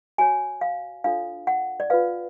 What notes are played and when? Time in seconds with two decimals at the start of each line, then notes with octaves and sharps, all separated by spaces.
0.18 F#4 C#5 G#5
0.61 F5
1.04 D4 F4 A4 C#5 F5
1.47 F#5
1.80 D5
1.90 F4 B4 F5